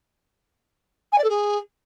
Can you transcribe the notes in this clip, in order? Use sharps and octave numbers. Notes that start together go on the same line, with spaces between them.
G#5
D5
A4
G#4